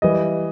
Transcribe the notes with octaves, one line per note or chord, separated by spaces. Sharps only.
E3 G3 D#5